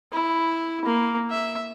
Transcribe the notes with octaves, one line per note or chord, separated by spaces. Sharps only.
E4
A#3
E5